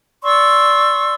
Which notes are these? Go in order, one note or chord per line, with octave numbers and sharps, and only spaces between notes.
D5 C6 C#6 E6